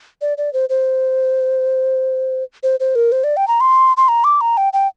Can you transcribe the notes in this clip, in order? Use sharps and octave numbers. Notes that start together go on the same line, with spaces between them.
D5
D5
C5
C5
C5
C5
A#4
C5
D5
G5
A#5
C6
C6
A#5
D6
A#5
G5
G5